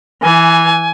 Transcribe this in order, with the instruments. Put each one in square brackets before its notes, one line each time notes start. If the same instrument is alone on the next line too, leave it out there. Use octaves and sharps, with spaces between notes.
[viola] E3 [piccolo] G#5